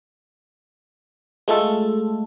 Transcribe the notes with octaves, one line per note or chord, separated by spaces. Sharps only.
G#3 A3 F4 A4